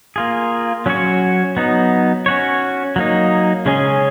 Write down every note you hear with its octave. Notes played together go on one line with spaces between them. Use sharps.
A#3 F4 G#4
F#3 C#4 F#4 C#5
F#3 B3 D#4
C#4 F#4 C#5
F#3 A#3 D#4
C#3 G#3 C#4 G#4 D#5